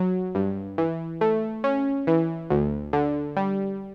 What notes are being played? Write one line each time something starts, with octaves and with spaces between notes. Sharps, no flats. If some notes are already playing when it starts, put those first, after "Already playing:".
Already playing: F#3
G2
E3
A3
C#4
E3
D2
D3
G3